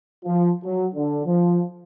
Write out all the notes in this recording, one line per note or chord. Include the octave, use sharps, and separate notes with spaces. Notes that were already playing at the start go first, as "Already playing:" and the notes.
F3
F#3
D3
F3